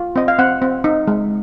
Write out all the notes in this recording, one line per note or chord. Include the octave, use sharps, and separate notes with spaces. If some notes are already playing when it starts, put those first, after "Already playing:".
Already playing: F4
C4 D#5
F5
C4 F#5
C4
D#4
G#3